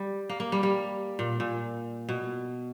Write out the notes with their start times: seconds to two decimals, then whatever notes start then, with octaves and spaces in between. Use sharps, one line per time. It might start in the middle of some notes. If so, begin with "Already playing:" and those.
Already playing: G3
0.30 A#3
0.40 A#3
0.52 G3
0.63 G3
1.19 A#2
1.40 A#2
2.09 B2